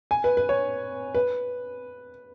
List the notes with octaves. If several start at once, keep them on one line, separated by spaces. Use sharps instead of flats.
G#5
B4
B4
C#5
B4